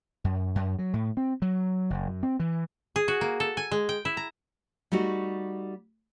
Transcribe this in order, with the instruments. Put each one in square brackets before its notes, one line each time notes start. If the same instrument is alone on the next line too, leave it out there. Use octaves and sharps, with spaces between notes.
[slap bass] F#2
F#2
F#3
A2
C4
F#3
F#1
F#2
C4
E3
[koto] G#4
F#4
A#3
A4
G#5
G#3
G5
E4
A#5
[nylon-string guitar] G3 A3 D#4 F#4